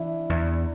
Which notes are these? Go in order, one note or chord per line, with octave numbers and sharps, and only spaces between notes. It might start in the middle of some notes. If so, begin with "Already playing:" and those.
Already playing: E3 D4 E4 D5 E5
E2